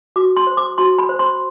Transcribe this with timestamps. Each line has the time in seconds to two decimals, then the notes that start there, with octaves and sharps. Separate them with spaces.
0.16 F#4 D6
0.37 C6
0.47 C5
0.57 D6
0.78 F#4 C6
0.99 B5
1.09 C5
1.19 C6